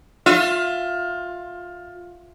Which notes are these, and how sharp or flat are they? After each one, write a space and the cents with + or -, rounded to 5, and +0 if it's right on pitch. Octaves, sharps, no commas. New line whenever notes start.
F4 +20 E5 +25